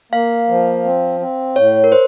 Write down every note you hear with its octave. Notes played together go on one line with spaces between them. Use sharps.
A#3 F5
F3
C4
C4
A2 C#5
A#4
C5